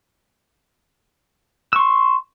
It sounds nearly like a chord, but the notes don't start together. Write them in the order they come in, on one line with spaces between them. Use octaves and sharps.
E6 C#6 C6